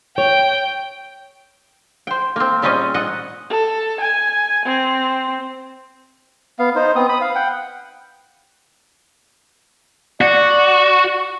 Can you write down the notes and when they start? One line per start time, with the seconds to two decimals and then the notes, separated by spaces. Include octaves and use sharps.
0.18 C#5 G5
2.07 C5 G5
2.36 A#3 C4
2.62 A#2 G3 C4 C#4 G#4 D#5
2.94 A#2 D#5 F#5
3.50 A4
4.00 G#5
4.65 C4
6.59 B3 F5
6.75 D#4 C5
6.96 B3 C4 D#6
7.09 B5 D#6
7.21 F5
7.35 F#5 G5
10.21 F#4 D5